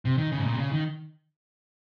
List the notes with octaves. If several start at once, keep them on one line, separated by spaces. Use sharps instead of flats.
C3
D#3
C#3
G#2
A#2
C3
C#3
D#3